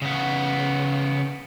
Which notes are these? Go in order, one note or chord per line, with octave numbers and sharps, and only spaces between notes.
C#3 B3